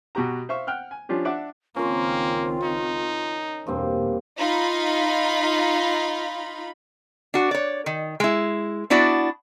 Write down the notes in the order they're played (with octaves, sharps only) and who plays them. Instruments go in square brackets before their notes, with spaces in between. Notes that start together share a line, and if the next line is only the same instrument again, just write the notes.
[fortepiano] B2 F#4 G4 A#5
C5 E5 F5 C#6
F#5 G5 F6 F#6
G#5
F3 C#4 D4 F4 G4
D4 E5 F#5 D6
[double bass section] C#2 D#3 C4 [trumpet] A#3 [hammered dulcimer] C#4 A#4 [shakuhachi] F4
[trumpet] D#4
[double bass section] E2 B2 [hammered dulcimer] G2 A#3 C4
[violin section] D#4 F4 B5
[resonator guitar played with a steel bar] D4 F#4
C#5 D5
D#3
G#3 E4
B3 D4 E4 F#4 D5